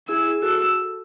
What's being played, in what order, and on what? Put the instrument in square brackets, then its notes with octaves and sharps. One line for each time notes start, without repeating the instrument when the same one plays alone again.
[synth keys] E4 G#4 [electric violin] E6
[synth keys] F#4 A4 [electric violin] E6